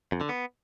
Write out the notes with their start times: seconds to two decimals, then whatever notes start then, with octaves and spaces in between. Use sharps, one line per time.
0.12 F2
0.21 D3
0.29 B3